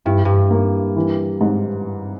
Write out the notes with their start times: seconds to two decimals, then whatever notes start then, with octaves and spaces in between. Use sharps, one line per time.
0.05 G2 E4
0.25 G2
0.51 A#3
0.96 E3
1.41 G#2